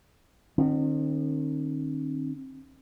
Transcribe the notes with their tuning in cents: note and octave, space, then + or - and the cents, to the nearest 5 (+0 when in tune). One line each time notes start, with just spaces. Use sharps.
D#3 -40 C4 +30